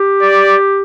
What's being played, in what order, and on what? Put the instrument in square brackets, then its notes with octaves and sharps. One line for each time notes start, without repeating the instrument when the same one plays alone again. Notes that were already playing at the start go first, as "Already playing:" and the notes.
Already playing: [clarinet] G4
[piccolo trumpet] D5